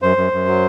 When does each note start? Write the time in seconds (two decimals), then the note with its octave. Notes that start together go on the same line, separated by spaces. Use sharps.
0.02 F#2 C5
0.17 F#2
0.32 F#2
0.47 F#3